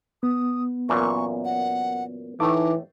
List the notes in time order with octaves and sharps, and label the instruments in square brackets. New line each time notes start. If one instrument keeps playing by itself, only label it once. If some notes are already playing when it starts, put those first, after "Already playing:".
[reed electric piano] B3 [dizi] D#6
[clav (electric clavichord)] F#2 A#2 E3 [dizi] C#6
[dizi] F#5
[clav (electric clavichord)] A2 A3 [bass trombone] E3 [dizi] D#4 [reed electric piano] D6